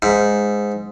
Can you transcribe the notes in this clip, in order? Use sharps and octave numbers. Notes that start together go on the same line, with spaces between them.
G#2